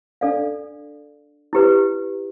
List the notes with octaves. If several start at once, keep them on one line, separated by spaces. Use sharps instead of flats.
D4 A4 D5 F5
E4 G4 B4